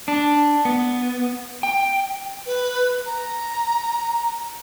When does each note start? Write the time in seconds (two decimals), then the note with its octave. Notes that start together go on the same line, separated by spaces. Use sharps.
0.08 D4
0.65 B3
1.63 G5
2.46 B4
3.06 A#5